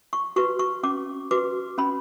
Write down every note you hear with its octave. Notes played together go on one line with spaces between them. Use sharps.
C#6
F#4 B4 C#6
C#6
C#4 D6
F#4 B4 D6
C#4 B5